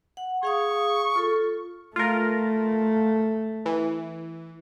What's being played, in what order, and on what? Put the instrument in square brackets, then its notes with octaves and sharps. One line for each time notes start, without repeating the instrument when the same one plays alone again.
[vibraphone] F#5
[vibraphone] G#4 F5 D#6 [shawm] C#6
[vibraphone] F4 A4
[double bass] A3 [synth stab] F4 A#4
[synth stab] E3